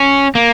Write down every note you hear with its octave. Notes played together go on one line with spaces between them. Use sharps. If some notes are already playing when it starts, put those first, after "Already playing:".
Already playing: C#4
A#3